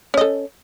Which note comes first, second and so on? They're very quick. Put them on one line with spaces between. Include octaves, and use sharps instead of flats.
C#4 D#5 A4